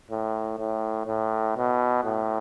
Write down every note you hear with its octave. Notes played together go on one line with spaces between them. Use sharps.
A2
A2
A2
B2
A2